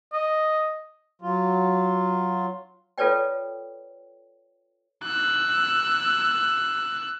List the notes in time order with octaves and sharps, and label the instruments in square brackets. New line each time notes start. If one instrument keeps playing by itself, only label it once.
[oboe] D#5
[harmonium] F#3 F4
[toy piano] F4 A4 B4 C#5 D5 G5
[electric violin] E6 F#6